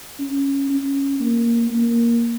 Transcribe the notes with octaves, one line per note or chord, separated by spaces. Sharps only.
C#4
C#4
A#3
A#3